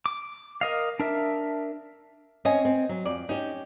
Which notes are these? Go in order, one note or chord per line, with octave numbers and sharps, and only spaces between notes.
D6
A#4 D#5 F5
D4 A#4 E5
C4 C#4 C#5 D#5 G#5
C4
F#3
F2 D5
C#4 D#4 G4